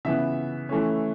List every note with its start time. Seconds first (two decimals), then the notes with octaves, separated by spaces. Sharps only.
0.05 C#3 E3 B3 E5
0.69 E3 A3 C#4